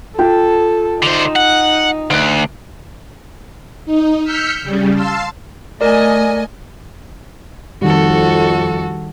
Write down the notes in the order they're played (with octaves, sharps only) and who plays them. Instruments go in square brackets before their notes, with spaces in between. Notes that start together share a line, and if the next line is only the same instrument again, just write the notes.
[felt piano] F4 G5 [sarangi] A4
[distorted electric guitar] D3 C5 [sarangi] D#4
[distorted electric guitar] F#5
[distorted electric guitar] D2 [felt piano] F#6 D7
[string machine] D#4
E6 F6 G6 B6 C#7
C#3 G3
F5 A5 C6 E6
[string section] A3 D#5 G#5 [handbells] A#4 D5
[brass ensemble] F2 [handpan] D#3 G3 [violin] F#4 A4